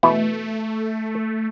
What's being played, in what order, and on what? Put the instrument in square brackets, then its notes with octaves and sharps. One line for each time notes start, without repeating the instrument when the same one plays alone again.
[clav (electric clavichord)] B2 E3 E4 [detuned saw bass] A3